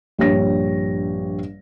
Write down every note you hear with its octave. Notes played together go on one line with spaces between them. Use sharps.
A#1 G2 G4 C#5 A#6